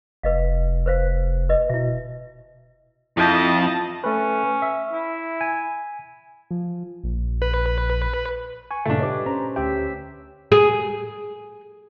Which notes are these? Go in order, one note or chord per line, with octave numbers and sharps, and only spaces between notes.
F1 B4 D#5 F5
B4 C5 F5
B4 D#5
B2 E4 E5
F2 E4 F4 D#5 A5 G6
A3 C#4 B4
E5
E4
G#5
F3
A#1
B4
G#5 C#6
G2 A#2 C#3 A3 D4
G4 B4 C#5 D#5 D6
C#4 C5 A#5
D2 G4 E5 G5
G#4